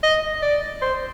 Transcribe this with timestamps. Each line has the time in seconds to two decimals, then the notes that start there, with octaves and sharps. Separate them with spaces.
0.03 D#5
0.42 D5
0.82 C5